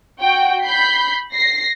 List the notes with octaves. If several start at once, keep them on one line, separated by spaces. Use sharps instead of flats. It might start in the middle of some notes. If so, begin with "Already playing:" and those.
F#4 G5
B5 G6 B6 C7
A#6 C7